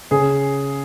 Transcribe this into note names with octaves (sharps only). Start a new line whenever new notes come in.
C#3 G#4